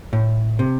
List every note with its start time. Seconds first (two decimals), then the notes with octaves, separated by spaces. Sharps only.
0.13 A2
0.59 C3